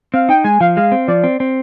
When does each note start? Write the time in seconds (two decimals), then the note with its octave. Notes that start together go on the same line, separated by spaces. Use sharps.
0.14 C4 F5
0.29 D#4 G5
0.44 G#3 G#5
0.61 F3 F5
0.76 G#3 F5
0.92 C4
1.07 F3 D5
1.24 C4
1.40 C4